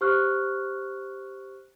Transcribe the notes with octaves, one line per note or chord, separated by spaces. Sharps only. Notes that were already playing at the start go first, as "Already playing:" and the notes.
G4 C5 C#6 F6 F#6